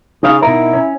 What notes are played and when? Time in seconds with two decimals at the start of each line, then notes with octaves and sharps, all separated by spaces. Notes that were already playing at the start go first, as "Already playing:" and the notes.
0.23 C#3 D#4 F5
0.43 B2 D#4 E4 A#4
0.73 C#4